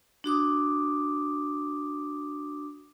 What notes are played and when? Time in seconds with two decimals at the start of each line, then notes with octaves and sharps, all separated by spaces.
0.24 D4 F#4 D6 D#6